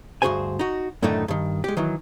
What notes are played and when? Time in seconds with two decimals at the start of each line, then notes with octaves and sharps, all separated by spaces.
0.22 D2 G2 F#4 G#4 C5 G#5
0.59 D#4 F#4
1.02 F#2 A2 D3 D#3 A3 D#4
1.28 G2 D#3
1.64 G#3 G4
1.77 D#3 E3 F#3